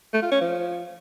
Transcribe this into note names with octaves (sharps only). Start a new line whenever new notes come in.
A3
F4
C#4
F3